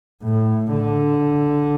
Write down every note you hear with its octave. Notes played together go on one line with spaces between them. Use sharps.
A2
D3